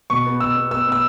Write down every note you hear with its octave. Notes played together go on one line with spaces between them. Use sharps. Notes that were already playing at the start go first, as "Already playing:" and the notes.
B2 C#6
B3
B2 E6
B3
B3 E6
B3 E6